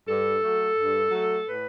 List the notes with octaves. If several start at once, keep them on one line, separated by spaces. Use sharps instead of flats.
G2 A4
F#3 A3
G2
F#3 A3
A2 B4